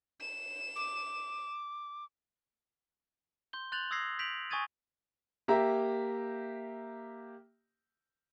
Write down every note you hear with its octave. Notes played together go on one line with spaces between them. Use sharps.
E7
D6
C6 G6 G7
C6 F#6 G6 A6 F7 F#7
D#6 E6 G#6 A#6 C7
G6 B6 D7 F7 F#7
G#5 C#6 D#6 G#6 A6 D#7
A#3 G4 E5 A#5